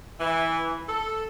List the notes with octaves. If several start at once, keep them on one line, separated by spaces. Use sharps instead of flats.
E3
A4